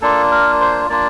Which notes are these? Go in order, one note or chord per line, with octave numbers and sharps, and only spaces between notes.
A#3 D4 F4 A4
A#4
C5
A#3 D4 F4 D5